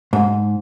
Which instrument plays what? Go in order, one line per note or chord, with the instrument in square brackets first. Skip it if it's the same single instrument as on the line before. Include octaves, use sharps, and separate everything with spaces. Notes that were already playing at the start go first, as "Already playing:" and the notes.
[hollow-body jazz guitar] G#2